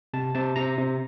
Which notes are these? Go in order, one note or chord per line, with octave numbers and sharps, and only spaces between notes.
C3 A5
C3 A5
C3 A#5
C3